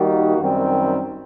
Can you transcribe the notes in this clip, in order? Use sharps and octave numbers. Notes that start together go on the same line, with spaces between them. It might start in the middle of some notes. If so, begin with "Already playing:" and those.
Already playing: D#3 G3 A#3 D#4 F#4
F#2 D#3 G3 C4